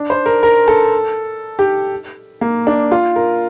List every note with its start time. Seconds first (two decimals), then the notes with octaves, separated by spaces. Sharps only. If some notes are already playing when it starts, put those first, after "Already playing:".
Already playing: D4
0.10 C5
0.26 A#4
0.43 A#4
0.68 A4
1.59 G4
2.41 A#3
2.67 D4
2.91 F4
3.16 A#4